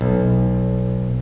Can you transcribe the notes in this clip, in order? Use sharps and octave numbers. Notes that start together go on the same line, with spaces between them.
B1